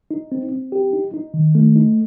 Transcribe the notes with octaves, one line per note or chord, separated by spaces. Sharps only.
D#4
C4
C4
G4
D#4
D#4
D#3
A3
D#4